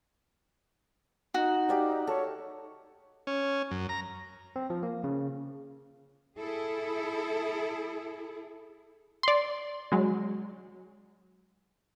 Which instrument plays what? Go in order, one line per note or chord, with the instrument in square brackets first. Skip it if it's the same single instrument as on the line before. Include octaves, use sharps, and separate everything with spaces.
[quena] D#4 [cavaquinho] F#4
[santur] G4 D5 F5
[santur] A4 [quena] C#5
[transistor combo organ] C#4
F#2
A#5
[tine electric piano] C4
F3
A#3
C#3
[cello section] E4 G#4 A4
[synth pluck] D5 C6
F#3 G#3